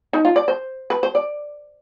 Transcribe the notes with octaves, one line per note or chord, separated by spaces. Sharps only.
D#4
F4
D5
C5
B4
C5
D5